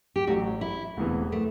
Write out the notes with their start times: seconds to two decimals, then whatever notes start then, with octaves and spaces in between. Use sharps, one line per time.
0.16 G4
0.27 A1 A2 F#3 F#4
0.61 E4
0.97 E1 D2 C3 E3 B3
1.32 A3